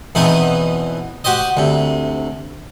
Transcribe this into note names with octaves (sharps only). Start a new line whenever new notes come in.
E2 B2 E3 B3 C4 D#4
F#4 G4 C5 D#5
D2 C3